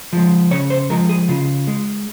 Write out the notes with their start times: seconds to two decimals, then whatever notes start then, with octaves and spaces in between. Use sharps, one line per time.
0.13 F3 G#3
0.51 C#3 C#5
0.70 C5
0.90 F3 G#3 A#4
1.09 G#4
1.29 C#3 F4
1.67 G#3